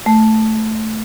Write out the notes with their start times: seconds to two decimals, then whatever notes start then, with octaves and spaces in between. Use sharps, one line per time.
0.06 A3